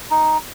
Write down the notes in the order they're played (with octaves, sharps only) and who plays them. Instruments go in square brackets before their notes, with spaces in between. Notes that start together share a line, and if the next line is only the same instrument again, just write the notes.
[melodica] D#4